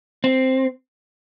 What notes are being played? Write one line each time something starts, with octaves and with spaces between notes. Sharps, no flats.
C4